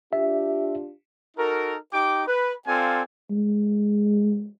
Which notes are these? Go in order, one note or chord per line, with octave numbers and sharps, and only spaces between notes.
D4 F4 G4 E5
D#4 F#4 A4 A#4
D#4 G4 G5 D6
B4
C4 F4 A4 D5 F5 G#5
G#3